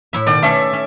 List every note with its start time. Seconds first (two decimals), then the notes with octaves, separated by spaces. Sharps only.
0.13 A2 E4 E5
0.27 B2 D#3 D5
0.42 A3 C#4 A4 E5
0.73 C#4